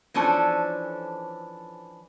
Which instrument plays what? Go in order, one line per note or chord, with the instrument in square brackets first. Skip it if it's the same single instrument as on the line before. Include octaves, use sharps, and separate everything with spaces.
[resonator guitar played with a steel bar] E3 F3 C#4 D4 A4 C5